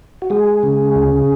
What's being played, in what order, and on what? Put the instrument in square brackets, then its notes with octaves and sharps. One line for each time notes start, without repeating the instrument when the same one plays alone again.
[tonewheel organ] F#4
G#3 G#4
C#3
D2